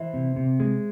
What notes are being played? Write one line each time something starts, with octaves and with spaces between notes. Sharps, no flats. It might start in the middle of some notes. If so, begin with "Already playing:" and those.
Already playing: E3 C5 E5
C3
C3
G#3